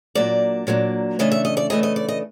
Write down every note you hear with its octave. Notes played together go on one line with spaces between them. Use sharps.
A#2 F#3 A#3 D4 D5
A#2 F#3 A#3 D4
C#3 E3 A3 D4 D#5
E5
D#5
D5
C#3 E3 A3 D4 D#5
D#5
D5
D#5